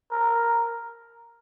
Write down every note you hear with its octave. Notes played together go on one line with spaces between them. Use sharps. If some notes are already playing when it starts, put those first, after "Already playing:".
A#4